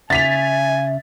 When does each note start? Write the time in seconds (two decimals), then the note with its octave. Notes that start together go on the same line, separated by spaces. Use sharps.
0.10 C#3 E5 G#5 A6 B6 F7